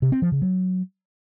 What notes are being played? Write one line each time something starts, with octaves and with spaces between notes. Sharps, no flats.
C3
C4
F3
C#3
F#3